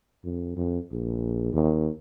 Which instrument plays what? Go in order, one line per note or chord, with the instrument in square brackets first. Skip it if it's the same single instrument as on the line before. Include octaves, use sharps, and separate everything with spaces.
[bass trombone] F2
F2
A#1
D#2